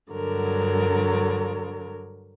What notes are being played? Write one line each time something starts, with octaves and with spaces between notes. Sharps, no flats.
G2 D3 F#3 A#4